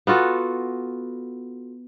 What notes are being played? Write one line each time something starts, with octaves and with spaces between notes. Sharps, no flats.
B3 F4 F#4 A4